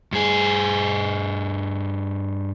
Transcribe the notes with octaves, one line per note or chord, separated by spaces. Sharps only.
G2 G#4